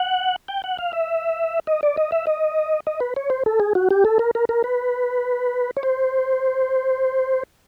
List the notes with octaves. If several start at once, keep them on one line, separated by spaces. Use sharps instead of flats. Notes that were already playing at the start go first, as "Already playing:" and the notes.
Already playing: F#5
G5
F#5
F5
E5
D#5
D5
D#5
E5
D#5
D#5
B4
C#5
C5
A4
G#4
F#4
G4
A4
A#4
A#4
A#4
B4
C#5
C5